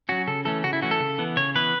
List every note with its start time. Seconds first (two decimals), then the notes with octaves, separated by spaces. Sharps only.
0.09 F#3 C#4 F#4
0.27 C#3 A4
0.45 E3 A3 C#4 A4
0.64 C#3 F#4
0.73 E4
0.82 E3 A3 C#4 F#4
0.91 A4
1.00 C#3
1.18 E3 B3
1.36 C#3 C#5
1.55 E3 B3 B4